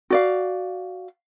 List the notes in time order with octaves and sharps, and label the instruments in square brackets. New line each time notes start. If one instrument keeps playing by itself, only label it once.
[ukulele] F#4 D5 F5